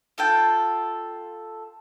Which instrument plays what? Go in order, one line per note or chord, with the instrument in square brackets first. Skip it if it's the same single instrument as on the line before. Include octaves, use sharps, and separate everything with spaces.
[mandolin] F4 A4 G5